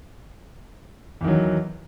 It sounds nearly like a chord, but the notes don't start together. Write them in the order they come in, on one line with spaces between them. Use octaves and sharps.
E2 D#3 F#3